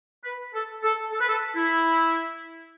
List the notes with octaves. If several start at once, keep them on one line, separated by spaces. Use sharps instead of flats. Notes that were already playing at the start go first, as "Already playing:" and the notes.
B4
A4
A4
A4
B4
A4
E4